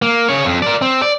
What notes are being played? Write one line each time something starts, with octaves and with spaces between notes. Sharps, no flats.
A#3
C#3 C#5
F2
A#4 D5
C4
D5